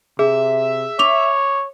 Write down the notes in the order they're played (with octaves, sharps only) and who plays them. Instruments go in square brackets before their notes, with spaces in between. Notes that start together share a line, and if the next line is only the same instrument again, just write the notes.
[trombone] C3 [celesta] G#4 [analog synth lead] E5
[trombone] C#5 [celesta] D6 F7